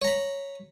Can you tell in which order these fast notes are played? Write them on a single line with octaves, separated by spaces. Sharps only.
C#5 A#5 B5